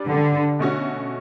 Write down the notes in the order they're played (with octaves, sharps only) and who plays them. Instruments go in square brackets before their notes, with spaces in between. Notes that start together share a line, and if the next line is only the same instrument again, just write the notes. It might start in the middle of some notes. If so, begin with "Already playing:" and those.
Already playing: [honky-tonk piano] G3 D4 G4 B4 D5
[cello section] D3
[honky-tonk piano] B2 A3 C#4 F#4